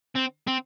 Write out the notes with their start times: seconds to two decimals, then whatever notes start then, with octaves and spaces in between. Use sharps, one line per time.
0.16 C4
0.47 C4